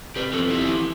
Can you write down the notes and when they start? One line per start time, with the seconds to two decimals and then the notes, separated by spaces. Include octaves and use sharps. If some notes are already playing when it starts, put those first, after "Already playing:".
0.15 C3 G4 B4
0.33 F2 F4 A4
0.50 B3 E4 G4
0.68 E3